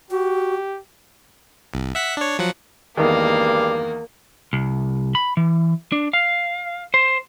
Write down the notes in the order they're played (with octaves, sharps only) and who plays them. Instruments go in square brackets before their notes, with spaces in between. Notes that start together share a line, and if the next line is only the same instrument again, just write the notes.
[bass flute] F#4 [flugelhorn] G4
[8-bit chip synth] C2
E5 F#5 B6
D4 C#5
F3 F#3 F#5
[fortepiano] E2 D#3 [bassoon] G2 [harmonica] G#3 F5 D6 [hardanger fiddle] A#3
[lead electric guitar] C2
B5
E3
D4
F5
C5